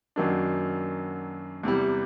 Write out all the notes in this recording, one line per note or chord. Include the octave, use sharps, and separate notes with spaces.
F#2 D#3 F#3 A#3 D4
E2 C3 E3 G3